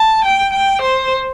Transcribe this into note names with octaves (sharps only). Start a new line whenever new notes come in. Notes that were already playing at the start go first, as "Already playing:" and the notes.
Already playing: A5
G5
G5
C5